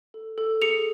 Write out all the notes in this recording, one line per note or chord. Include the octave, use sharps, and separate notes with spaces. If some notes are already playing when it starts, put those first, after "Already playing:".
A4
A4
G#4 C#7 F7